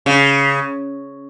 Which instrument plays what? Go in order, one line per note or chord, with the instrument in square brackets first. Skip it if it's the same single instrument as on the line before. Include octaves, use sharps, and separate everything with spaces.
[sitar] C#3